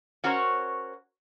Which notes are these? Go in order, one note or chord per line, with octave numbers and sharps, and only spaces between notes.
C#4 F#4 A#4 C5 C#5